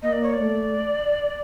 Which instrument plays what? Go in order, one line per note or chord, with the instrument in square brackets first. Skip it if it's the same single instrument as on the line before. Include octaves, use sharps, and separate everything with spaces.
[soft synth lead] A#3 [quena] D#5
[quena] D5
C#5
D5
[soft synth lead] A3